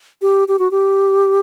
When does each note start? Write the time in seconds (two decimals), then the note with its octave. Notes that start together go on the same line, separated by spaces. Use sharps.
0.22 G4
0.48 G4
0.59 F#4
0.71 G4